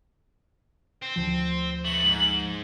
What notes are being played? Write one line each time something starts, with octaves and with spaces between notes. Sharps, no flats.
C4
D2 F3
B2 A3 F#7
G#2